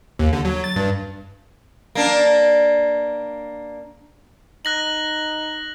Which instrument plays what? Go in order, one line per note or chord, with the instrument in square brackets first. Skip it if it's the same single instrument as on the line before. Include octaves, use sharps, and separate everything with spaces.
[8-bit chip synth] D#2
D3
F#3
A6
G2
[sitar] A#3 D4
[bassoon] D#4 [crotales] F#6 A#6 F#7